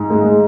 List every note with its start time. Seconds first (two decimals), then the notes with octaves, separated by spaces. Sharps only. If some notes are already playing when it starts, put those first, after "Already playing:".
Already playing: G#2
0.10 G#3